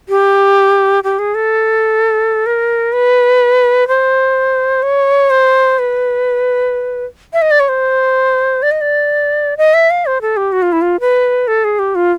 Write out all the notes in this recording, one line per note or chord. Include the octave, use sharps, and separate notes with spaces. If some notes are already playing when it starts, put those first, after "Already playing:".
G4
G4
G#4
A4
A#4
B4
C5
C#5
C5
B4
E5
D#5
D5
C#5
C5
D5
D#5
D5
D#5
E5
F5
C5
A4
G4
F#4
F4
E4
F4
B4
A4
G#4
G4
F4